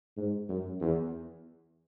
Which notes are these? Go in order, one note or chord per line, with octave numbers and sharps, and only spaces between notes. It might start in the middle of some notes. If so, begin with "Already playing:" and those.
G#2
F#2
E2